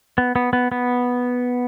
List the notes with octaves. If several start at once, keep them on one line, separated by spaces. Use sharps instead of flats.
B3
B3
B3
B3